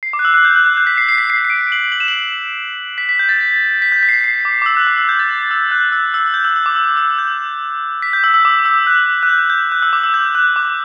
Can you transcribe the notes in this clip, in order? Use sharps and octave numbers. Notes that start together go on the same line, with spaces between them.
C7
D6
F#6
E6
F#6
G6
F#6
F#6
G6
B6
C7
C7
B6
C7
C7
D7
F#7
F#7
E7
F#7
B6
B6
G6
A6
B6
G6
B6
C7
B6
C7
D6
D6
E6
F#6
D6
E6
G6
A6
E6
F#6
E6
E6
G6
E6
E6
D6
E6
E6
G6
B6
G6
E6
E6
D6
E6
F#6
F#6
G6
G6
F#6
E6
D6
E6
G6
F#6
D6